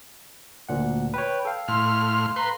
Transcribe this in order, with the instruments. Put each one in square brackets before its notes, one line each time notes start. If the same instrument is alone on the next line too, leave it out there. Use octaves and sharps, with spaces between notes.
[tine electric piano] D2 A#2 F#5
[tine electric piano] B4 C#5 [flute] G5
[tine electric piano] A4 F5
[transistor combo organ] A2 F6 [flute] C6
[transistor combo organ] B4 C6 [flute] A#5